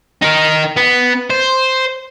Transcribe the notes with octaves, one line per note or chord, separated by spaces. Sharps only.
D#4 A#4
B3
C5